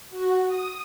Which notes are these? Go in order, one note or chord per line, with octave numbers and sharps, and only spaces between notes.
F#4
D#6